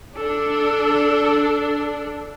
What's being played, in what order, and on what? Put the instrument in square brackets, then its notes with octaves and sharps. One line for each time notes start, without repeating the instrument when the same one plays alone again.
[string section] D4 [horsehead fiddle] A4